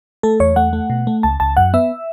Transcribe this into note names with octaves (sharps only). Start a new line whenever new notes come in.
A3 A4
E2 C#5
A3 F#5
A3
B2
A3
C#2 A5
C#2 A5
F#2 F#5
B3 E5